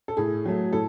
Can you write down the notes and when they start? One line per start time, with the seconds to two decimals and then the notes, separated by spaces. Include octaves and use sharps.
0.08 A4
0.17 A2 G#4
0.45 F#3 A3
0.73 A2 A4